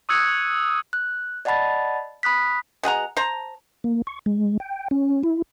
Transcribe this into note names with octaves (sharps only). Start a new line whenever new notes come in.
C#6 D#6 E6 F#6 G#6 C#7
F#6
D5 D#5 F#5 A5 B5 A6
B5 D#6 F#6 B6
B2 G#4 F#5 A#5
C5 A5 A#5
A#3
C#6
G#3
G5
C#4
E4